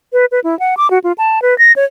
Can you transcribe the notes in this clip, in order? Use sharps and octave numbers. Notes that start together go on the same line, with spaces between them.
B4
B4
E4
F#5
D6
F#4
F4
A5
B4
A#6
C#5